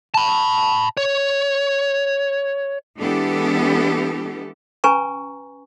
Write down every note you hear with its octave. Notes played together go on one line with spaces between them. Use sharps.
A5 B5
C#5
E3 G#3 B3 D4 G4 A4
C#4 B4 G#5 A#5 C#6